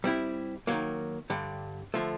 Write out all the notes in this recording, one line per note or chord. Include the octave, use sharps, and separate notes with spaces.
G3 C4 E4
D#3 F#3 A#3
G2 D3 G3
D3 F3 A3